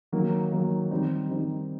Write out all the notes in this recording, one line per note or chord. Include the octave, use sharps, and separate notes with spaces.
D#3 F#3 A#3
D#3 F#3 A#3
D#3 G3 C4 D#4
D#3 G3 C4 D#4